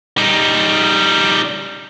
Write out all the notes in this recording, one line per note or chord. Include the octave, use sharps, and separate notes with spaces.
G3 D#4